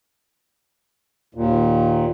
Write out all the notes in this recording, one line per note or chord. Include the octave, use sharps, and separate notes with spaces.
D#2 A#2